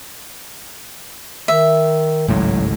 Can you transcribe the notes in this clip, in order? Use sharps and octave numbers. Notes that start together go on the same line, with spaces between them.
D#3 E5
G#1 C#2 A2 F#3